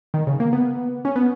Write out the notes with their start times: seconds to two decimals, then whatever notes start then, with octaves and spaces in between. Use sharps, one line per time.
0.14 D#3
0.27 C#3
0.40 A#3
0.53 B3
1.05 C#4
1.16 B3